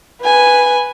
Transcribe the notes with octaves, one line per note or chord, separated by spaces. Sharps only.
B4 G#5